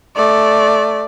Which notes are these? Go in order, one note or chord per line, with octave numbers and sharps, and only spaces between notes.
A3 D5